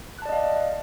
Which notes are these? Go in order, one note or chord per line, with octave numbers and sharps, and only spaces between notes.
D5 D#5 F5 A5 F#6